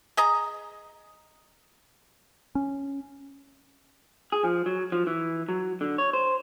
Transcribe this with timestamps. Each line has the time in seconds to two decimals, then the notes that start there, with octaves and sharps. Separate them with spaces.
0.17 G#4 D#5 A#5
2.55 C#4
4.32 G#4
4.44 F3
4.66 F#3
4.92 F3
5.07 E3
5.49 F#3
5.81 D3
5.98 C#5
6.13 C5